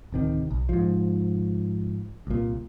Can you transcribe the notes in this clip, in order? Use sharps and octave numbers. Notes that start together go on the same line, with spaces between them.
D1 C3 D#3
B1
G#2 F3
C2 A#2